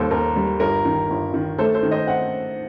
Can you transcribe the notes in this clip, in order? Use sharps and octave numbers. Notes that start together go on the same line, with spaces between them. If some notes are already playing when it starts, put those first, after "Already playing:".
Already playing: D#2 G3 A4 C5
D#2 A#4
G3
G1 A#4
D#3
G1
D#3
A3 A4 C5
A4 C5
D#3
C5 D#5
C4 F#5